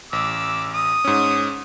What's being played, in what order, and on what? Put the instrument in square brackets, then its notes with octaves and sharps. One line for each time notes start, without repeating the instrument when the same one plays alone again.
[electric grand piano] A1 [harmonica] D6 E6
[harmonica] D#6
[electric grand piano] G#2 C#4